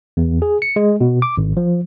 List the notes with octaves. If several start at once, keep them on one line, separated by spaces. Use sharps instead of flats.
E2
G#4
C#7
G#3
B2
D6
G#1
F3